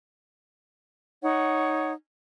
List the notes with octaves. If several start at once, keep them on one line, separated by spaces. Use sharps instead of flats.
D#4 C#5 F#5